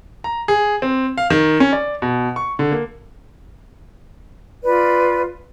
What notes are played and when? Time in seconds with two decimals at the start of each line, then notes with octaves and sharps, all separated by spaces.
0.24 A#5
0.48 G#4
0.82 C4
1.18 F5
1.30 D#3
1.60 C#4
1.73 D5
2.02 B2
2.36 C#6
2.59 D3
2.72 A#3
4.64 F4 B4 D5